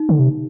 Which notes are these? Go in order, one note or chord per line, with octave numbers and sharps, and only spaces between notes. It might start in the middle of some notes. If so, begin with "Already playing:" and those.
Already playing: D#4
D3
C3